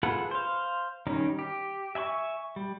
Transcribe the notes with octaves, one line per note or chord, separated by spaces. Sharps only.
F4 G#4 A4 B4 F#5
C5 F5
D#3 G3 C#4 D#4
G4
E5 G#5 B5 C#6
G3